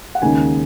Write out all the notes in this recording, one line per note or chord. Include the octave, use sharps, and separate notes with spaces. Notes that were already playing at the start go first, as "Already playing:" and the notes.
F#5
D#2 C#3 G#3 D#4 G#5